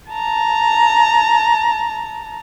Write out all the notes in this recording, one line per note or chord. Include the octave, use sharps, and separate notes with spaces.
A5 A#5